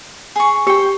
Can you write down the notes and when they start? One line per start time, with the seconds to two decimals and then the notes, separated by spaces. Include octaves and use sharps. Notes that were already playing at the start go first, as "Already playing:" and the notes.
0.36 G#4 C#6
0.67 G4 C5 G5